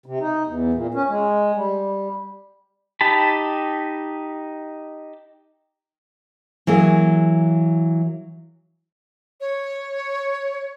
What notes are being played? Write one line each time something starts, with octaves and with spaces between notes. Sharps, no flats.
C3
D#4
E2
A#2
C#4
G#3
G3
D#4 G4 A5 B5
E3 F#3 A#3 G#4
C#5